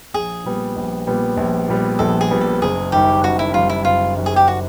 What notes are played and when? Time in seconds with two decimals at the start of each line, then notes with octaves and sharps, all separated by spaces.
0.14 A#1 G#4
0.44 A#2 G3 B3
0.76 A#1
1.07 A#2 G3 B3
1.37 A#1
1.68 A#2 G3 B3
1.99 A#1 A4
2.21 G#4
2.31 A#2 G3 B3
2.41 A4
2.62 F#1 G#4
2.92 F#2 D#3 G3 G4
3.23 F#1 F#4
3.39 E4
3.54 F#2 D#3 G3 F4
3.69 E4
3.85 F#1 F4
4.16 F#2 D#3 G3
4.26 G#4
4.36 G4
4.48 F#4